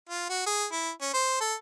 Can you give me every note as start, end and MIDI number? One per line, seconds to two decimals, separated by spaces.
0.09 0.29 65
0.29 0.43 66
0.46 0.66 68
0.72 0.90 64
1.01 1.10 61
1.14 1.38 72
1.40 1.54 69